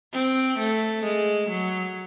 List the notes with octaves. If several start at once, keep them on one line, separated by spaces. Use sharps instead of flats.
C4
A3
G#3
F#3